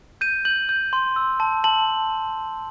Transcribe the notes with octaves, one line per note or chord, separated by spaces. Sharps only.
G6 D#7
G6 F#7
G6
C6
E6
A5
A5 F#7